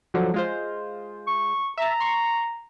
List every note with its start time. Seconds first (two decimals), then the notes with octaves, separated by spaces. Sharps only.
0.14 D3 F3 F#3
0.34 G#3 F4 C5
1.27 C#6
1.78 E5 A5 A#5
2.00 C6 C#6